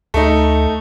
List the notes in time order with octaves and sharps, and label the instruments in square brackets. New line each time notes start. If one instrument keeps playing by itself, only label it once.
[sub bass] D2 [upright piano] A3 D#4